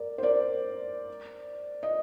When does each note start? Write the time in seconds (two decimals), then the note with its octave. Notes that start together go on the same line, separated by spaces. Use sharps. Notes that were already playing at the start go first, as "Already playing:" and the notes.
Already playing: A#4 D5
0.18 C5
0.23 A#4 D5
1.83 D#5